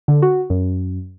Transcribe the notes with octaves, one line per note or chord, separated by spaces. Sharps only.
D3
F#4
F#2